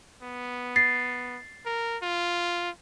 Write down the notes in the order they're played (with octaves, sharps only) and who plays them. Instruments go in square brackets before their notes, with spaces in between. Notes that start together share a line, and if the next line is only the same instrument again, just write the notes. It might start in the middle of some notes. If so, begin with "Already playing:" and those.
[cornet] B3
[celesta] A6 C7
[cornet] A#4
F4